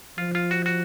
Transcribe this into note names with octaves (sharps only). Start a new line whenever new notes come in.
F3 F4
F4
F#4
F#4